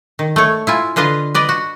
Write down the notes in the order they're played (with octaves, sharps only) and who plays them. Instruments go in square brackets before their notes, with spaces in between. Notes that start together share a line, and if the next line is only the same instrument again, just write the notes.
[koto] D#3
A3 C#5
E4 F4 G#5
D3 F4 B4 D#5 F5
B4 D5 D#5
F#4